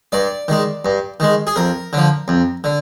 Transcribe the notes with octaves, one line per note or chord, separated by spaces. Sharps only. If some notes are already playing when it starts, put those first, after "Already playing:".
G2 D5
D#3 G#3
G2
D#3 G#3
G#4
F2 A#4
D3 F3
F2
D3